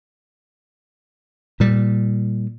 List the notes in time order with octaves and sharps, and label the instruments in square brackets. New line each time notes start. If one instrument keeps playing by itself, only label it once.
[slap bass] A#2 G3